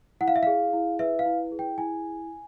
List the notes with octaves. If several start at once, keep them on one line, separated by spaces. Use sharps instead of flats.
E4 F#5
F5
E5
G#4 F5
E4
B4 E5
F5
E4
G#4
G5
E4 G#5